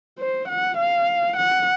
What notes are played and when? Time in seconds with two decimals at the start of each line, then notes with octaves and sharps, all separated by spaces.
0.19 C5
0.48 F#5
0.78 F5
1.36 F#5